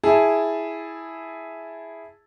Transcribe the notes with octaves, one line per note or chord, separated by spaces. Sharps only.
E4 G#4 A5